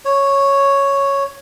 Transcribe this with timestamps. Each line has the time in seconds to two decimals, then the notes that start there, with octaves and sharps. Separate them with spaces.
0.05 C#5